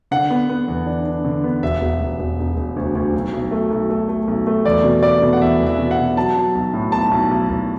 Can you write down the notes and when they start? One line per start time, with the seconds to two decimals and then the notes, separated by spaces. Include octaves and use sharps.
0.11 D3 F#5
0.31 B3
0.49 B3
0.68 E2
0.86 D4
1.05 D4
1.25 D3
1.44 B3
1.63 E1 E5
1.81 E1
2.01 E1
2.19 E1
2.39 E1
2.57 E1
2.76 D2
2.95 D2
3.13 B1
3.33 B1
3.51 A3
3.70 B1
3.90 A3
4.09 A3
4.28 B1
4.47 A3
4.65 E2 D5
4.84 B2
5.03 A3 D5
5.21 B2
5.33 F#5
5.41 E2 E5
5.60 E2
5.67 E5
5.78 B2
5.91 F#5
5.97 B2
6.16 F#3 A5
6.36 F#3
6.55 B1
6.73 A2
6.92 B1 A5
7.11 B1
7.31 B1
7.49 B1